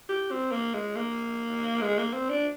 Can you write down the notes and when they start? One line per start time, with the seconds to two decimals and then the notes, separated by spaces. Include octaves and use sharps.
0.09 G4
0.31 C4
0.52 A#3
0.74 G#3
0.96 A#3
1.82 G#3
1.98 A#3
2.14 C4
2.30 D4